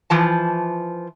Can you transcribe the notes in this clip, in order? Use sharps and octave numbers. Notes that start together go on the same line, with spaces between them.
E3 F3 A5